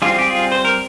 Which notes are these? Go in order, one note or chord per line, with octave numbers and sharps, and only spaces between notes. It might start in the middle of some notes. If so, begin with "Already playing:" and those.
G3 C4 F4 G#4
G4
F4 G#4
C5
A#4